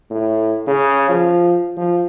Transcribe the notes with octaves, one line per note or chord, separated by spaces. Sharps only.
A2
C#3
F3
F3